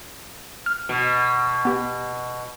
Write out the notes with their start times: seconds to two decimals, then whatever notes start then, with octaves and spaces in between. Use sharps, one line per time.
0.66 F6
0.89 B2
1.65 B3 G4